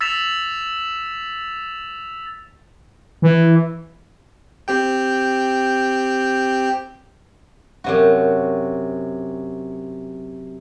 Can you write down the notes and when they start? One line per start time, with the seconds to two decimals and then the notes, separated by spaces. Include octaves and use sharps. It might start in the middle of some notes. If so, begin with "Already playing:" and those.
0.01 E6 A6 B6 E7 F7
3.22 E3
4.68 C4 G4 G5
7.84 F#2 C3 F#4